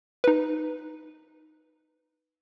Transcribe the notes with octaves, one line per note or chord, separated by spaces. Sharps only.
D#4 B4